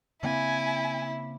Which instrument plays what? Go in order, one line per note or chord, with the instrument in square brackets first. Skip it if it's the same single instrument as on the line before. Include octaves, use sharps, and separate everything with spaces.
[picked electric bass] C#3 A#3 C4 [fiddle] E4 [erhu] G#5